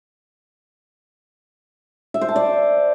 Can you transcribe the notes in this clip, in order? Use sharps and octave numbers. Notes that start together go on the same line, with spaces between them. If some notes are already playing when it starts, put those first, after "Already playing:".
E5
C5
A5
D5